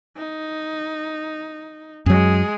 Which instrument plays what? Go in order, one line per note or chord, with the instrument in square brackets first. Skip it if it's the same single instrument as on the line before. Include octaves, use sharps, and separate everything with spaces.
[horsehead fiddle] D#4
[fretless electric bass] F#2 F#3 [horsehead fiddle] G#3 G#4